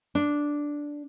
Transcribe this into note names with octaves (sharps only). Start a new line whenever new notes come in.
D4